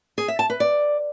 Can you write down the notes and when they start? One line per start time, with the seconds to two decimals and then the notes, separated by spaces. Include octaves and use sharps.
0.18 G#4
0.28 E5
0.39 A5
0.50 B4
0.60 D5